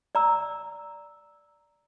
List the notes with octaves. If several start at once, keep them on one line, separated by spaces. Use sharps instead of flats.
D5 A#5 E6